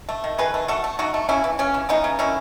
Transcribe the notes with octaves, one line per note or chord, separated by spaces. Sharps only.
A3
D#3
D#3 G#4 B4
A3
A3 F#4 A4
A3
A3 D#4 F#4
A3
C#3 C#4 E4
E3
C#3 C#4
E3
E3 B3 D#4
C#3
D#3 C#4 E4